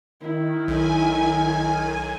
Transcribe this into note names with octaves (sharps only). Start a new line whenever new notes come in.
D#3 E4
B1 G#5